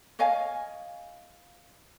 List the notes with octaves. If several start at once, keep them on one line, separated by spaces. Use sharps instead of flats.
C#5 D#5 F5 G#5